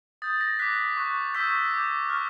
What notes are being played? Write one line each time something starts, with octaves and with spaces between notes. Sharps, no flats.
D#6 G6 A6
A#6
D6 F#6 B6
C#6 F#6
C#6 E6 G6 B6
D6 G6
C#6 F6